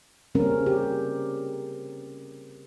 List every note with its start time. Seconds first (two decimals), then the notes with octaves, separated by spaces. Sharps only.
0.35 C#3 G3 A#3 C4 C#4 A#4
0.66 G4